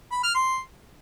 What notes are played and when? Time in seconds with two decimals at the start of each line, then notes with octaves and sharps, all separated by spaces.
0.12 B5
0.23 F6
0.35 C6